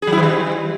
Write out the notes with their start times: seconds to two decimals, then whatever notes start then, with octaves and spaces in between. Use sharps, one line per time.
0.02 G#4
0.07 F#3
0.12 E4
0.17 E3
0.23 G3